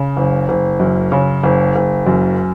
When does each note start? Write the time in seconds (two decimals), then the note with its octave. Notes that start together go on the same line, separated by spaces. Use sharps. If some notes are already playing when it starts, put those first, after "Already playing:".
Already playing: C#3
0.17 F#1
0.49 F#1
0.80 F#2
1.12 C#3
1.43 F#1
1.75 F#1
2.07 F#2